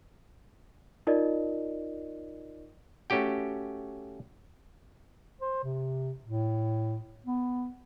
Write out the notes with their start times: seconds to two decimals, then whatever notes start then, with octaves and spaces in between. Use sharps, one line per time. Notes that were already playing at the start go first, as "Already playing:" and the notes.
1.07 D#4 F4 A#4 D5 D#5
3.10 A3 C#4 F#4 G4 G5
5.41 C5
5.64 C3
6.24 A2
7.26 B3